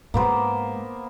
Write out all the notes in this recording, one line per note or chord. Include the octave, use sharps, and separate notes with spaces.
G#2 G#3 A#3 B3 C5